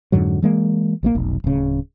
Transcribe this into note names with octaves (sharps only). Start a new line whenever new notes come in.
F2 G#2 D3 F#3
E3 G#3 A#3
A#1 F3 A#3
F1 B1
D1 C#3